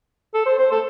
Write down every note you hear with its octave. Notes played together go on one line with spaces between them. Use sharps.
A4
C5
C5
A4